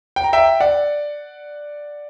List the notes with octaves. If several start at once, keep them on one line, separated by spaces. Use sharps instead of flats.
G5
A#5
E5 G5
D5 F#5